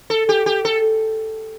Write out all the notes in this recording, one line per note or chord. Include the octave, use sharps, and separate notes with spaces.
A4
G4
G4
A4